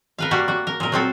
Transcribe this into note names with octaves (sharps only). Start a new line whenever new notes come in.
A#4 B4 F5
G3 A#3 F#4 F#5
F#4
A#4
A#2 A#4
F#3 C4 A4